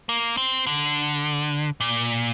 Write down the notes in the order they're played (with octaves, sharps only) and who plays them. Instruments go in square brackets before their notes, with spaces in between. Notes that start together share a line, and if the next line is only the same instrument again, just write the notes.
[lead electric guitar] A#3
C4
D3
A#2